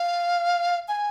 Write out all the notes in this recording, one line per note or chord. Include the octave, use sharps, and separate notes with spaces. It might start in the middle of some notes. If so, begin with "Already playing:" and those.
Already playing: F5
G#5